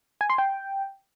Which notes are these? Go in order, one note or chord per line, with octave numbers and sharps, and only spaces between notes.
G#5
C6
G5